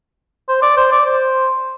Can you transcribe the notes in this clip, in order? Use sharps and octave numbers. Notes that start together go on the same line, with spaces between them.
C5
D5
C5
D5
C5